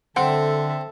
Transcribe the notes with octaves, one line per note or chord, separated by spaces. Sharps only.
D3 C4 A4 E5 F#5 G5 C6